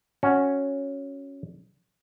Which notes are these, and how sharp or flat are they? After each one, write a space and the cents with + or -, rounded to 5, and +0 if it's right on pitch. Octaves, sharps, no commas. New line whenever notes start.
C#4 +0 F#4 +0